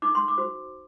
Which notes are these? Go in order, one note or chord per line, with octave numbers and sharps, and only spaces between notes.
D#4 D6
C6
D6
F#4 C5